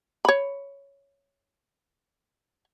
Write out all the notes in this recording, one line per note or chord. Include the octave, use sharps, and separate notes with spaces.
C#5 B5